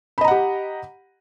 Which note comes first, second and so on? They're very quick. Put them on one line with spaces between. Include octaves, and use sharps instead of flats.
B5 D#5 A#5 F#5 G4